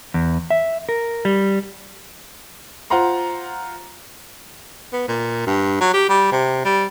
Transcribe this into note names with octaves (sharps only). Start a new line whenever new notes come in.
E2
E5
A#4
G3
F4 C5 F#5 A#5 C6
B3
A#2
G2
F#3
G4
G3
C3
G3